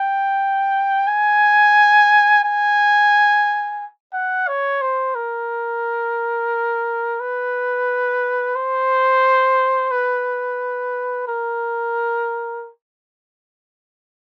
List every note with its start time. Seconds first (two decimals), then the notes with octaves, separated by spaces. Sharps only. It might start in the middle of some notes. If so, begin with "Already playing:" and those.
Already playing: G5
1.07 G#5
2.43 G#5
4.13 F#5
4.48 C#5
4.82 C5
5.15 A#4
7.20 B4
8.56 C5
9.91 B4
11.28 A#4